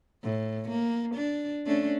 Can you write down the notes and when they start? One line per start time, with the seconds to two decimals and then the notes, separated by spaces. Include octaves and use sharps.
0.24 A2
0.70 A#3
1.15 D4
1.66 A3 C#4 D4